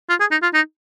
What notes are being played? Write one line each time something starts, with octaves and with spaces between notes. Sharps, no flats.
F4
G#4
D#4
F4
D#4